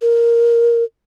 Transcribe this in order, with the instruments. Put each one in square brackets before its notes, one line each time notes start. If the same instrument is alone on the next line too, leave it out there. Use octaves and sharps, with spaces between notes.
[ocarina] A#4